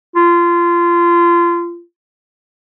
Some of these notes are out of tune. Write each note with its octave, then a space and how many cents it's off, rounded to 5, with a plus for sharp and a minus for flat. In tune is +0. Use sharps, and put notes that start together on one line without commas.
F4 -25